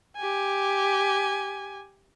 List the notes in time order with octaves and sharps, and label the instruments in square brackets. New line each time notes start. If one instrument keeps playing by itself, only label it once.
[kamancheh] G4 G#5